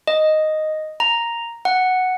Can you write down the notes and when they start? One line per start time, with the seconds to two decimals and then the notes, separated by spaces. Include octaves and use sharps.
0.07 D#5
1.00 A#5
1.65 F#5